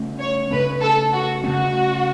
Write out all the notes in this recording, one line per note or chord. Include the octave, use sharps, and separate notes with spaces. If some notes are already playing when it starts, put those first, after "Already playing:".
Already playing: C#3 A3 C#4
C#5
C#3 A3 C#4 B4
A4
F#4
C#3 A3 C#4 F#4